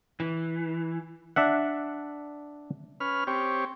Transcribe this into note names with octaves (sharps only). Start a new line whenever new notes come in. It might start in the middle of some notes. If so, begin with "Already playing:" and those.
E3
D4 E5 F#5
C#4 B4 F6
C4 G4 C#5